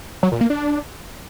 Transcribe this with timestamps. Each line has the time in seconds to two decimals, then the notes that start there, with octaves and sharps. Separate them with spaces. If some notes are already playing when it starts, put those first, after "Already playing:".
0.23 F#3
0.32 A#2
0.41 A#3
0.50 D4